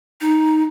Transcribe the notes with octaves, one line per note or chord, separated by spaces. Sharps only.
D#4